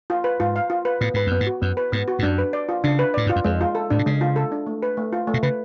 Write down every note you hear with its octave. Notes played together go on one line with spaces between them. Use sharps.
F4
B4
G#2 F4
F5
F4
B4
A2 B3
G#2 B4
F#2 B3
G#2
F#4
F#2 B3
B4
G#2 B3
F#4
G#2
F#2 D4
B4
D5
F4
C#3 D4
B4
A2 D5
G#2 F4
F#2
F2 G#3
F4
A4
A2 D4
B2
C#3 G#3
F4
A4
D4
A3
B4
A3
F4
A3
B2
C#3 B4